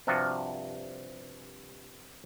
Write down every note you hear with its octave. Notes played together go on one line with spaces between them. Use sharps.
G2 C3 F3 F4 F#4